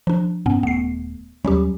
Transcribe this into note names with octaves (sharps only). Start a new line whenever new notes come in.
F3 D4
G2 B2 B3 C#4
D#1 A3 B3 C7
D#2 F#3 G3 C#4 G4